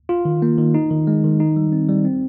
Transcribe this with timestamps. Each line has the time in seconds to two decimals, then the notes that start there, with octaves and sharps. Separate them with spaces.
0.09 F4
0.25 D#3
0.42 A#3
0.58 D#3
0.74 D#4
0.91 D#3
1.07 G#3
1.24 D#3
1.40 D#4
1.56 G3
1.72 C4
1.89 G3
2.05 C4